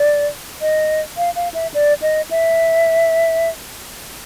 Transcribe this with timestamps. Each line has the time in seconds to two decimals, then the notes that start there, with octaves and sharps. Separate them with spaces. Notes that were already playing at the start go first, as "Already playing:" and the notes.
Already playing: D5
0.61 D#5
1.17 F5
1.36 F5
1.54 E5
1.74 D5
2.02 D#5
2.31 E5